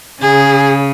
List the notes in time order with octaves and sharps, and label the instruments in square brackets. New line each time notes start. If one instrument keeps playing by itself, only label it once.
[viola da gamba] C#3 [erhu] G#4